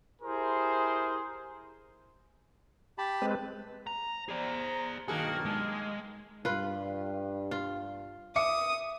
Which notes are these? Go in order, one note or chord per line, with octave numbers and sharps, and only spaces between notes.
E4 G4 G#4 A#4 C5
G4 A5 B5
G#3 C4 B4
A#5
G#4 C5 D5 A#5
B1 G2 D#3 A#3 F#4 G#4 A5
G#3
G2 F4 B4
F4
E5 D6 D#6 C#7